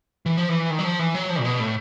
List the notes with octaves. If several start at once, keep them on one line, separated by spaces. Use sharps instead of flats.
E3
F3
E3
D#3
F#3
F3
E3
F#3
F3
A#2
B2
A2